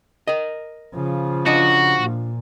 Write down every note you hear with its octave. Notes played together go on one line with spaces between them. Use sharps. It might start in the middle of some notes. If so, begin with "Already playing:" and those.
A#4 D#5
C#3 F3
D4 F4 F#4 D#5
A#2